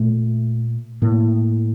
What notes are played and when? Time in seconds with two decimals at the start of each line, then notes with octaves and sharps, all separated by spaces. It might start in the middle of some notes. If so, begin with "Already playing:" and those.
Already playing: A#2 A3
1.02 A2 A#3